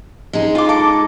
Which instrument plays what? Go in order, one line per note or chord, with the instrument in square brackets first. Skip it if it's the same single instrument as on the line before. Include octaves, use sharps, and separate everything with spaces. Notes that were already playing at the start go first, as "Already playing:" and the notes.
[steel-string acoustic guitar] G#3 D#4
[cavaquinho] F4 D6
A4 D6